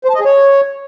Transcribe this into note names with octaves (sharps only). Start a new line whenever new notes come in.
C5
A5
D#5
G#4
C#5